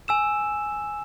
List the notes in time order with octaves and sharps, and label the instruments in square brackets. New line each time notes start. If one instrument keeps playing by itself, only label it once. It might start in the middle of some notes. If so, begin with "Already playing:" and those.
[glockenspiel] G#5 E6 E7